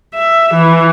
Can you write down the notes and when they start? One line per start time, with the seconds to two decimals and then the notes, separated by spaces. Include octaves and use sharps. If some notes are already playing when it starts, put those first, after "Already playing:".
0.15 E5
0.55 E3